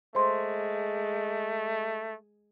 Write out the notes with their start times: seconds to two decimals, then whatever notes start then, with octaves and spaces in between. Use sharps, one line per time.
0.15 G#3 A3 C5 C6